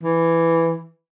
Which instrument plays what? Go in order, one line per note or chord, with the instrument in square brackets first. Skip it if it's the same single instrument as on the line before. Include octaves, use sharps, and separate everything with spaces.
[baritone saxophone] E3